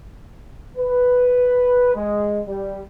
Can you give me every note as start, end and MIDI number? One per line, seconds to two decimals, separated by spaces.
0.77 1.91 71
1.95 2.40 56
2.47 2.80 55